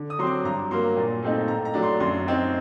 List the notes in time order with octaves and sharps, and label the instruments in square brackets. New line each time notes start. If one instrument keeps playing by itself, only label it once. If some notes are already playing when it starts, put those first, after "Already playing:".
Already playing: [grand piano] D3
D#6
F#3 C6
C4 D6
G2 A#5
F#3 A#3 C6
A#2
A3 C4 D#4
A2 A#5
A#5
F#3 A3 D4
C6
F#2 C6
F#3 C4 D#4